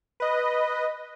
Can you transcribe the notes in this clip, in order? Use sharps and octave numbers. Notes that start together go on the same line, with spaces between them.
B4 D#5